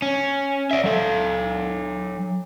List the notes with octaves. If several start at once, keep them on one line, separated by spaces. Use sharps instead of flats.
C#4
D5 E5
F#3 A4